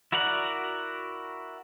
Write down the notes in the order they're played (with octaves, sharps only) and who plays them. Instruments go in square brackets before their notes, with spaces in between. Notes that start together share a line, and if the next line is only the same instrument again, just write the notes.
[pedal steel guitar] E4 F#4 A#4 D5 F#5